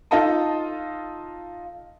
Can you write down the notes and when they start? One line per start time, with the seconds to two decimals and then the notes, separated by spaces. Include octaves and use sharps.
0.11 D#4 F4 A4 D#5 A5